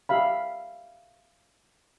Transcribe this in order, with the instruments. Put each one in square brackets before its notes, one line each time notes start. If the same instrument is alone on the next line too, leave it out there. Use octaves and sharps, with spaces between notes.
[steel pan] G4 E5 F5 B5